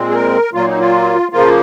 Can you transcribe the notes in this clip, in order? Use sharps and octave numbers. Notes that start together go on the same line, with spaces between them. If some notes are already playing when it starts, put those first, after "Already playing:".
Already playing: A#2 G#3 C4
G#4
A#4
A#2 F#3 A#3 F4
D#4
F4
C#3 F3 A#3 F4